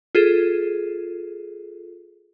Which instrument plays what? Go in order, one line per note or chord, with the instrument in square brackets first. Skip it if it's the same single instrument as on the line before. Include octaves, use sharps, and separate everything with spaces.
[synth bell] F4 G#4 A4